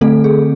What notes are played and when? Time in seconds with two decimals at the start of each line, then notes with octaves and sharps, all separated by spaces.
0.01 D3 A3 C4 A4
0.24 G#4